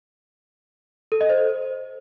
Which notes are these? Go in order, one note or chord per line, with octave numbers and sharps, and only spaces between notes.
A4
D#5
C5